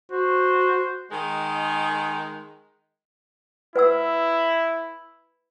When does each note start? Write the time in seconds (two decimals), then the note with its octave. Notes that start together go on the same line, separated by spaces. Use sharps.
0.12 F#4 C5
1.11 D#3 G#3
3.76 E4 B4 F#5 E6